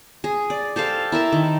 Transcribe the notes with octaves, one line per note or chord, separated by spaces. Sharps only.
G#4
D5
G4 A4 C5 F5
E4 A#4 E5 A5
D#3